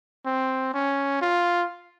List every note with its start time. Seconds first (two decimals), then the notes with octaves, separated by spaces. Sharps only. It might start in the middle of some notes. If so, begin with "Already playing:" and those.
0.25 C4
0.74 C#4
1.21 F4